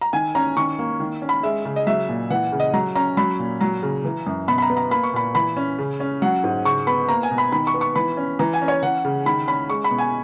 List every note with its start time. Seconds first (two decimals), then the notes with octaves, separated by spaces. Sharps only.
0.01 A#5
0.13 D#3 G#5
0.35 C#4 A#5
0.57 D#3 C#6
0.79 A#3
1.00 D#3
1.22 C#4
1.29 B5
1.43 G#3 E5
1.65 C#3
1.76 D#5
1.87 F#3 E5
2.09 A#2
2.30 E3 F#5
2.52 C#3
2.60 D#5
2.73 F#3 A#5
2.95 C#4 A#5
3.17 F#3 B5
3.39 A#2
3.61 F#3 A#5
3.83 C#3
4.04 E3
4.26 F#2
4.48 B2 B5
4.58 B5
4.62 A#5
4.70 B3
4.77 A#5
4.91 A#3 B5
5.03 C#6
5.13 A#2 B5
5.35 E3 B5
5.56 C#4
5.78 C#3
6.00 C#4
6.22 F#3 F#5
6.44 G#2
6.65 C#3 C#6
6.87 B3 B5
7.09 A#3 A#5
7.23 G#5
7.31 B2
7.38 B5
7.52 D#3 B5
7.67 C#6
7.74 B3
7.81 C#6
7.95 E3 B5
8.17 C#4
8.39 E3 A#5
8.54 G#5
8.62 C#4
8.68 C#5
8.83 E3 F#5
9.05 C#3
9.26 D#3 B5
9.48 C#4 B5
9.70 G#3 C#6
9.84 B5
9.91 B2
9.98 G#5